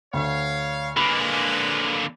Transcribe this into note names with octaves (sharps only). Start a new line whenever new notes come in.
D2 C#5 F5
D3 G#3 A#3 B4 B5